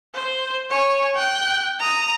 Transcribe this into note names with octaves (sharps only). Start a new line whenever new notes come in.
C5
C#5 G#5
G5 F#6
A#5 D#6